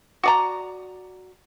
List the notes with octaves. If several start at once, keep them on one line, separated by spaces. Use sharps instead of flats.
F#4 D5 A#5